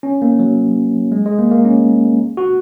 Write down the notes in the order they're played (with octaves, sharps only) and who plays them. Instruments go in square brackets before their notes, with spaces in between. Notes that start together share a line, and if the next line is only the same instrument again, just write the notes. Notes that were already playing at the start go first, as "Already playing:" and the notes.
[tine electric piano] C#4
A#3
F#3
G#3
G#3
A#3
A#3
C#4
F#4